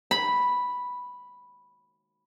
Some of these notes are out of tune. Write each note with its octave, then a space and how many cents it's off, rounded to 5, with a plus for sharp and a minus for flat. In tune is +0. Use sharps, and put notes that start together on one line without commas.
B5 -5